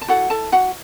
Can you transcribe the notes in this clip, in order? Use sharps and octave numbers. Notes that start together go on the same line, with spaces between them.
A5
E4 F#4 A4 F#5
A4 A5
F#4 F#5